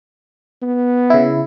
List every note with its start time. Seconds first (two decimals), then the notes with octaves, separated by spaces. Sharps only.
0.62 B3
1.10 C#3 E4